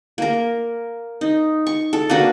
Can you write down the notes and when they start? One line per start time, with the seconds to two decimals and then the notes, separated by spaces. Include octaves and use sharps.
0.18 A#3 A#4
1.21 D#4
1.67 C#6
1.93 A4
2.10 A#3 D4 F#4 B4